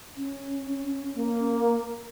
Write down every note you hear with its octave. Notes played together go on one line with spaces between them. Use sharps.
C#4
A#3